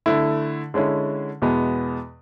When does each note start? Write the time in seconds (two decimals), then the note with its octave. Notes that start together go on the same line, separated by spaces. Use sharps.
0.06 D3 A3 E4
0.74 D3 G#3 C#4 E4
1.42 E2 B2 G#3 B3